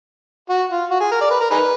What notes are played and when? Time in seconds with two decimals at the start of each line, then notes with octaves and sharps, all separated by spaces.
0.49 F#4
0.70 F4
0.90 F#4
1.00 G#4
1.12 A#4
1.21 D5
1.31 B4
1.41 A#4
1.51 D#4 G#4 B4